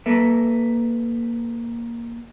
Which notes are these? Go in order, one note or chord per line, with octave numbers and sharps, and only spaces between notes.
A#3 A4 B4 E5